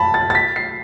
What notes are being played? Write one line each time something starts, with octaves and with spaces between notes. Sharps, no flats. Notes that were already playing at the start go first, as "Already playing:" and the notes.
Already playing: A5 B5 A6
A6
A6
B6
C7